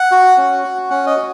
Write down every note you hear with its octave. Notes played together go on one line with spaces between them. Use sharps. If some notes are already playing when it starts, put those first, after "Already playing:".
Already playing: F#5
F#4
C#4
F#4
C#4 F#5
D#5
F#4